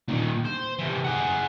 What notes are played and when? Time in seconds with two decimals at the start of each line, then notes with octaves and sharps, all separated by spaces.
0.08 A#2 D#3
0.45 C5
0.79 C3 E3
1.04 G#4 F#5